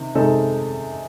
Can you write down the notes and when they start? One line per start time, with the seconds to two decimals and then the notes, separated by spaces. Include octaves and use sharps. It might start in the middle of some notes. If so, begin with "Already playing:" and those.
Already playing: C3 D#3
0.15 C3 D#3 G#3 D#4 A4